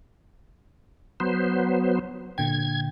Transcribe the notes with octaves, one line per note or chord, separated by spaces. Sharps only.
F#3 B3 C5
A#2 D3 G5 G#6